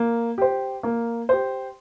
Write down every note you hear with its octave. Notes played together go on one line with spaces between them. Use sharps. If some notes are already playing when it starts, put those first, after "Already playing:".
Already playing: A#3
G4 C5
A#3
G4 C5